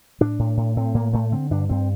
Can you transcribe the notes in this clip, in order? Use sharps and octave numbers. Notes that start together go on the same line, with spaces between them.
A2 D4
A2
A2
A2 C4
A2 A#3
A2 A3
D3 C4
G2 D4
G2 C4